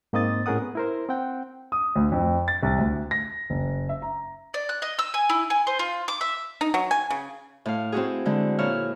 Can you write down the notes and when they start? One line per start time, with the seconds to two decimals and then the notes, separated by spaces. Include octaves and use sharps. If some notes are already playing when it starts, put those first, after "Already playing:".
0.13 G#2 A#3 C4 D#5 D#6 A6
0.46 A2 C#4 G#4 A#4 F#5 D#6
0.62 B3
0.75 E4 A#4 C5
1.09 C4 F#5 G5
1.72 D#6
1.96 D2
2.12 F2
2.48 A6
2.63 C2
2.79 D2
3.11 A#6
3.50 F#1
3.89 E5
4.02 A#5
4.54 D5
4.69 F#6
4.82 D#5
4.99 E6
5.14 G#5
5.30 E4
5.50 G#5
5.67 C5
5.79 F4
6.08 D6
6.21 E5
6.61 D#4
6.74 F#3
6.91 G#5
7.10 C#3
7.66 A2 F5
7.92 C4 E4 F#4 G#4
8.26 D3 G#3 E4
8.59 A#2 E4 C#5 F6